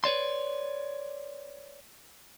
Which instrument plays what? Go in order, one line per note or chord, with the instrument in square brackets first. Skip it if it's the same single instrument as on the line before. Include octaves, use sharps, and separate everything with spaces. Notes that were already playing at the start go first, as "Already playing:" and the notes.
[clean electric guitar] B4 C#5 D5 C6